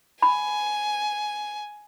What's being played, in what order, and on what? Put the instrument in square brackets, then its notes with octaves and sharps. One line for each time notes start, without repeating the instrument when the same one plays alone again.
[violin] G#5 [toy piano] B5